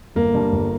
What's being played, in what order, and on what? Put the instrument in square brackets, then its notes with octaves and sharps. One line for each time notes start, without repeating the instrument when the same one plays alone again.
[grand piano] G1 A#3
G2
G1